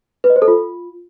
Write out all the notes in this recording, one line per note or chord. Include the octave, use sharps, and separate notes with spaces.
B4
D#5
C5
A4
F4